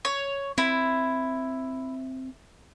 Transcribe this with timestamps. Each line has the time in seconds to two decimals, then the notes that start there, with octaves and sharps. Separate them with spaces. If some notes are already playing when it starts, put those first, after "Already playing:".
0.05 C#5
0.58 C4 E4